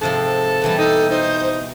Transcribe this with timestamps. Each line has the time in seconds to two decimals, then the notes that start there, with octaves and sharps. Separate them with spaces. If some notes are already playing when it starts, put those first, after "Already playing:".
0.01 G#2 C3 F3 A4
0.62 B2 E3 G3
0.78 D#4 A4
1.10 D#4 C5